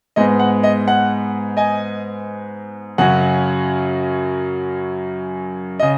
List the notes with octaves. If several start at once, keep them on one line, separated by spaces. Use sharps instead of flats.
G#2 G#3 B3 D#5
F#5
D#5
F#5
D#5 G#5
F#2 C#3 F#3 C#4 F#5
C#3 D#5